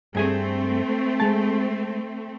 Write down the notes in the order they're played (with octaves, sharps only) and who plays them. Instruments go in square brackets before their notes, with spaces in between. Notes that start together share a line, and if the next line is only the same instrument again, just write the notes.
[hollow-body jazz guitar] G2 G#4 G#5 [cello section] A3 C4
[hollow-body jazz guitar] G#3 A5